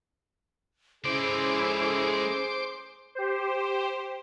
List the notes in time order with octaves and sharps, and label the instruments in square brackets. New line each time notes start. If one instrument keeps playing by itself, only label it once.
[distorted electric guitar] G#3 D5 [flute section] C#4 E4 A4 [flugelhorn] G#4 [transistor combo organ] C5 D6
[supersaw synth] G4 C5